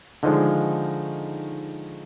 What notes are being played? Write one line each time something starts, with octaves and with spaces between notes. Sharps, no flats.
D3 D#3 F3 G#3 D#4